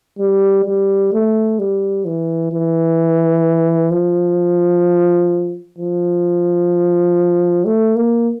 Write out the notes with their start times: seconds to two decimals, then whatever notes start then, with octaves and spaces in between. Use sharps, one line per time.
0.18 G3
0.65 G3
1.13 A3
1.59 G3
2.05 E3
2.52 E3
3.91 F3
5.78 F3
7.65 A3
7.96 A#3